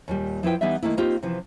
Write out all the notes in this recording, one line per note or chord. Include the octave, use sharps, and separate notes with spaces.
D#2 A#2 G3
F3 E4 B4 G5
E3 G3 B3 D#4 D5 E5
D#3 E3 A3 A#3 E4
A#3 C4 D#4 F4 G4
C3 E3 F3